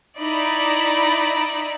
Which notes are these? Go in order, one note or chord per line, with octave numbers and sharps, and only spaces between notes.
D#4 E4 D5 B5